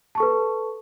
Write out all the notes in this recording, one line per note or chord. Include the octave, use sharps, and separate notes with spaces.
A4 B4 A5 C#6